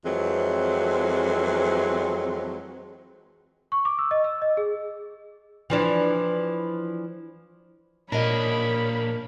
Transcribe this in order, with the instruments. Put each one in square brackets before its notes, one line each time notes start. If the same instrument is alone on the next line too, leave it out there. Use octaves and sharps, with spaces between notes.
[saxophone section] F2 E3 F#3 G#3 C4
[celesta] C#6
D6
E6
D#5
E6
D#5
G#4
[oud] E3 F3 D4
[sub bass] A#2 [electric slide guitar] A#3 D4 [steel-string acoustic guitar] A#4 D#5 [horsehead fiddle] C#5 B5